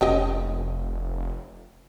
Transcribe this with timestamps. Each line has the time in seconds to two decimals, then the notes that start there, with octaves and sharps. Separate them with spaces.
0.01 F1 C#4 G4 D#5